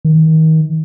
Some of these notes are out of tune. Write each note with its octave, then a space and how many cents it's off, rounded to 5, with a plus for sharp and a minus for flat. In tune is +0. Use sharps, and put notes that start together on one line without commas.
D#3 +30